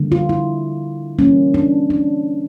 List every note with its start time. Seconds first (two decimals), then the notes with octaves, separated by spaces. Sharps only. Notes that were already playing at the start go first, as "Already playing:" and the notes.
Already playing: D3 G3 A#3
0.12 F4
0.29 E4
1.18 E3 G3 A#3 C#4
1.54 D4
1.90 D4